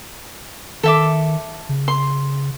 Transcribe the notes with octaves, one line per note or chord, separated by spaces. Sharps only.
D#3 A4 E5 D6
C#3
C6